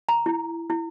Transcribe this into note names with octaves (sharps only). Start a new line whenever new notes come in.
A#5
E4
E4